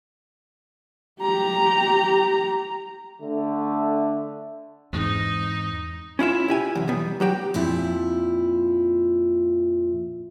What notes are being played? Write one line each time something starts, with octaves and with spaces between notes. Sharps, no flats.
G4 A#5
D3 A3
E2 G#2 C4 D#4
C#4 E4 F4 E5
E4 G4 G#5
B1 E2
B1 E2 G3 B3
F#3 F#4 G4 G5
F2 A#2 F3 E4